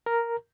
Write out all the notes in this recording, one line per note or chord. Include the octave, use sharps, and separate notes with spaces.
A#4